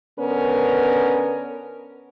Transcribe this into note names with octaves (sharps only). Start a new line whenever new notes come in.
D3 B3 C#4 A#4 B4